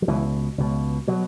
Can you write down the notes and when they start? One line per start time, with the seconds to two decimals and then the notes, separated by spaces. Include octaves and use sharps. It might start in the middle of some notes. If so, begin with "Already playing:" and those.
0.02 F#3
0.07 C#2 B2 E3
0.58 C#2 B2
1.07 B2 F#3